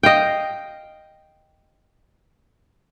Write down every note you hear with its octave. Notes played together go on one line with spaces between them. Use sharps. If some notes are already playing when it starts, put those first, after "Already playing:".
D#5 F5 G5